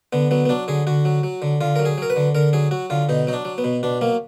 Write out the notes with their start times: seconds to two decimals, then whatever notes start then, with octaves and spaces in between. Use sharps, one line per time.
0.13 D3 B3
0.31 F#3 B3
0.45 B3
0.49 F#3 D4
0.68 D3 G#4
0.87 D3 F#4
1.05 F#3
1.23 F#3
1.42 D3
1.61 D3 F4
1.76 F#3 A#4
1.85 G#4
1.98 F#3 A#4
2.10 B4
2.16 D3
2.35 D3 A#4
2.53 F#3 G#4
2.71 F#3 F#4
2.90 D3 F4
3.09 B2 D#4
3.27 F#3 D#4
3.33 D4
3.45 F#3
3.58 B3
3.64 B2
3.83 B2 D4
4.01 F#3 A#3